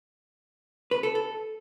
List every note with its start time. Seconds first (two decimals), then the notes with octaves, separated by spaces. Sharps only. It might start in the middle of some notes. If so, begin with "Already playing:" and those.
0.91 B4
1.03 A4
1.15 A4